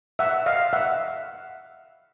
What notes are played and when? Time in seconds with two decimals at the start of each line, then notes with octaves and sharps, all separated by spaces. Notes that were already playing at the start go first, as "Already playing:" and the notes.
0.19 E5 F#5
0.46 D#5 F5
0.73 E5 F#5